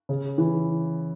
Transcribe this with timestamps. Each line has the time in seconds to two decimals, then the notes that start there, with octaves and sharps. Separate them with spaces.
0.09 C#3
0.38 E3